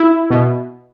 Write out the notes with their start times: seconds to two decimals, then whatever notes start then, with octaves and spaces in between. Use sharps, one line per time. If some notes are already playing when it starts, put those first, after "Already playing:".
Already playing: E4
0.30 B2